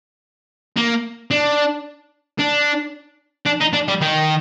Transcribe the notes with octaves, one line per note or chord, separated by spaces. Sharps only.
A#3
D4
D4
D4
D#4
D4
G3
D#3